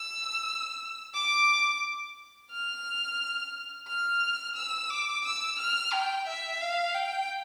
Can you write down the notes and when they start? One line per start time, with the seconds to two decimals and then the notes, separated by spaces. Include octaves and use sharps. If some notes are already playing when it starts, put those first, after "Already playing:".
Already playing: E6
1.15 D6
2.51 F6
3.88 F6
4.56 E6
4.90 D6
5.25 E6
5.59 F6
5.93 G5
6.27 E5
6.61 F5
6.95 G5